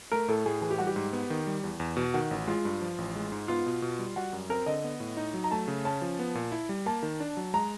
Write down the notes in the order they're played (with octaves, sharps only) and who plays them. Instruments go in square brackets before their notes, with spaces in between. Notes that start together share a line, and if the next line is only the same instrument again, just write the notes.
[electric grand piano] A3 [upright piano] A#4
[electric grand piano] A2 [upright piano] A4
[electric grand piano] A2 [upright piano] G#4
[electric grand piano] E3 [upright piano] G#4
[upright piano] G4
[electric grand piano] G3 [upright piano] F#4
[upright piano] G4
[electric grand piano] G#2
B3
D#3
G3
E2
E2
B2
[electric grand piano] D#3 [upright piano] F#4
[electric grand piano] A1
[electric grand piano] G#3 [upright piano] F4
[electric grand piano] G2
F3
A1
G#3
G#2
[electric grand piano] B3 [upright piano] F4
[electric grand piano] B2
B2
G3
[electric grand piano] G3 [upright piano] F#4
[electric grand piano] F#2
[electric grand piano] C4 [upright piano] A#4
[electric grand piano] D3 [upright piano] D#5
[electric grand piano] B3
A2
D#4
F#3
[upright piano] A#5
[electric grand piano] A3 [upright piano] A5
[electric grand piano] C#3
[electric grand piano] C#4 [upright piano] A5
[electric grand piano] F3
B3
A#2
E4
G3
[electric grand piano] A#3 [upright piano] A5
[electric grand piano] D#3
D4
F#3
[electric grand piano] G#3 [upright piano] A#5